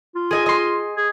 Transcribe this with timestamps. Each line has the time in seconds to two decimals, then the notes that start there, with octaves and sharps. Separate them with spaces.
0.15 F4
0.31 G#4 D#5 G#5
0.46 D#5 C6
0.97 G#4